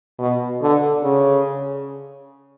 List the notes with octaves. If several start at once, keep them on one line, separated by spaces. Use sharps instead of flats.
B2
D3
C#3